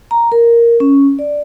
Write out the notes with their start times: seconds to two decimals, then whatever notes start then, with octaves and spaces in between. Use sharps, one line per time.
0.11 A#5
0.32 A#4
0.80 C#4
1.19 D5